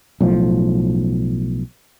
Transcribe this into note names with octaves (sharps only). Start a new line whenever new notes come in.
B1 A2 F3